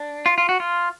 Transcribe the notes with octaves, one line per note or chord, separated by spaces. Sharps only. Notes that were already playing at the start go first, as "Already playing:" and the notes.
Already playing: D4
F4
F4
F#4
F4